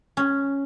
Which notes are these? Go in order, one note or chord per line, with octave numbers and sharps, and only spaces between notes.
C#4